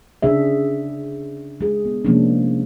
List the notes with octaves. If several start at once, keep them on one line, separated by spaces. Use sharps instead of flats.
C#3 D4 G#4 E5
G#3 G#4
B3
C3 F3 G#3 A#3 C#4 D4